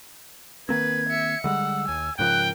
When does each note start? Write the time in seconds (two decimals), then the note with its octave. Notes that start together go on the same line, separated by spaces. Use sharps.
0.69 D#3 A#3 C4 B4 G#6
1.09 E5 C#7
1.44 D3 G3 G#3 F#5 E6
1.88 D#2 G#5
2.19 G#2 C#3 F3 A#4 G5 F#6